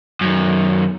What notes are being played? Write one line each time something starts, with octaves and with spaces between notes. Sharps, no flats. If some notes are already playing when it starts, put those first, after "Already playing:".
F#2 D#3